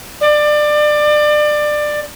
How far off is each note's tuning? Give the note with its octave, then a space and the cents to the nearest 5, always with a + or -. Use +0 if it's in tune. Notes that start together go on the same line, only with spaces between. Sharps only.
D5 +25